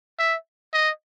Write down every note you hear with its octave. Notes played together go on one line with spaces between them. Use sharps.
E5
D#5